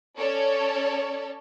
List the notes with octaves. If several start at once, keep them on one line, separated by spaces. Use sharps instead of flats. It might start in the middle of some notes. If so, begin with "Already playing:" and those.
C#4 A4 C#5 D5